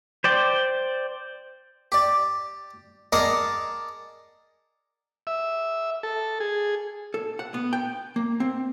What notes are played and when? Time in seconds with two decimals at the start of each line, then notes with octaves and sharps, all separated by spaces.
0.24 C5 D5 G5
1.92 G4 D5
3.13 G#4 A#4 D5 D#5 F#5 A5
5.27 E5
6.03 A4
6.40 G#4
7.14 A4
7.39 F#5
7.54 B3
7.73 G5
8.16 A#3
8.40 C4